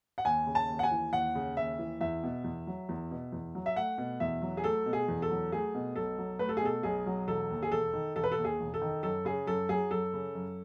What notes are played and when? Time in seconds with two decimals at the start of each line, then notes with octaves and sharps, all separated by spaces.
0.18 F#5
0.25 D#2 G#5
0.47 C#3
0.55 A5
0.69 D#2
0.79 F#5
0.83 G#5
0.91 E3
1.13 D#2 F#5
1.35 C#3
1.57 D#2 E5
1.79 E3
2.01 E2 E5
2.23 B2
2.44 E2
2.67 F#3
2.89 E2
3.11 B2
3.32 E2
3.55 F#3
3.66 E5
3.76 A3 F#5
3.98 B2
4.20 E2 E5
4.42 F#3
4.57 G#4
4.64 A3 A4
4.86 B2
4.93 G#4
5.08 E2
5.22 A4
5.30 F#3
5.52 A3 G#4
5.75 B2
5.96 B1 A4
6.18 F#3
6.39 A3 B4
6.49 A4
6.57 G#4
6.62 B2 A4
6.83 B1 G#4
7.06 F#3
7.27 E1 A4
7.50 D#2
7.63 G#4
7.71 E1 A4
7.93 D#3
8.16 E1 A4
8.24 B4
8.32 A4
8.38 D#2
8.44 G#4
8.60 E1
8.74 A4
8.81 D#3
9.03 F#2 A4
9.25 C#3 G#4
9.47 F#2 A4
9.69 F#3 G#4
9.91 F#2 A4
10.13 C#3
10.35 F#2